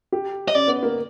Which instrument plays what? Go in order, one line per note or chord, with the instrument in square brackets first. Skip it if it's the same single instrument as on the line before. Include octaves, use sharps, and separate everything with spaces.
[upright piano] G4
[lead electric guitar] D#5
[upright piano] C#4 [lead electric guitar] D5
[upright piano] B3
A#3